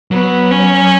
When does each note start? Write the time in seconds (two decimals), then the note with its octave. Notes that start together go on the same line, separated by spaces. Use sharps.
0.11 F#3 B3
0.51 C#4